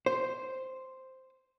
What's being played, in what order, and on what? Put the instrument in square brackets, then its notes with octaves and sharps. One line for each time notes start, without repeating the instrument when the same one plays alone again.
[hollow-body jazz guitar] C5